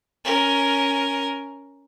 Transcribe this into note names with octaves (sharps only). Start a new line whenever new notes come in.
C#4 A#4